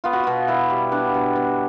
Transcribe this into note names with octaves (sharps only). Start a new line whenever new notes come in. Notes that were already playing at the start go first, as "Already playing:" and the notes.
B3 F4
F#4
B2 F4
B2 E4
G3
B3 D4
B2
B2